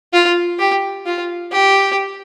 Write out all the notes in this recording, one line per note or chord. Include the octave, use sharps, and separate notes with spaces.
F4
G4
F4
G4